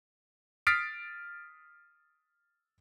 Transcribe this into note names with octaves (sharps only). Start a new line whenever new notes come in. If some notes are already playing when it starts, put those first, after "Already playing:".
D#6 F6 A6 B6 C7 D7